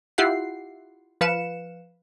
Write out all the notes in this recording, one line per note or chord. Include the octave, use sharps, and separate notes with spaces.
E4 F4 G4 F#5 C7
F3 B4 F5 C#7 E7